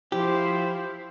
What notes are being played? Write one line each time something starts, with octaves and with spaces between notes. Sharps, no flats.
F3 E4 F4 G4 C5